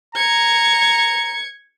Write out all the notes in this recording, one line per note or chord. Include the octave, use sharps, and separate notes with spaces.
A#5 G#6 C#7